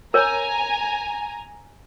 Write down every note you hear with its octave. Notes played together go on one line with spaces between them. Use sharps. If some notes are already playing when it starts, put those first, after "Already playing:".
A#4 C#5 G#5 A#5